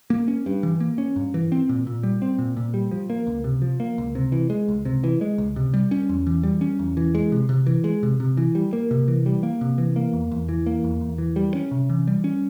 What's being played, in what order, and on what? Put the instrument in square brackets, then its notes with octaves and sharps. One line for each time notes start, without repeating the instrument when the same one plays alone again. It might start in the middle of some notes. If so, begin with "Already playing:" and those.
[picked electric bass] A#3
C#4
G2
E3
A#3
C#4
G2
E3
C4
A#2
A#2
G3
C4
A#2
A#2
G3
F3
A#3
C#2
C3
F3
A#3
C#2
C3
E3
G#3
C#2
C3
E3
G#3
C#2
C3
G3
C#4
E2
E3
G3
C#4
E2
E3
G#3
C3
C3
E3
G#3
C3
C3
E3
G3
A#3
C3
E3
G3
A#3
C3
E3
A#3
E2
E2
E3
A#3
E2
E2
E3
G3
C#4
C3
E3
G3
C#4